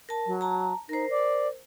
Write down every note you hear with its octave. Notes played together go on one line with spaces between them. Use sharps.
A#4 A5
F#3
A5 A#5
D#4 A#4 C5
D5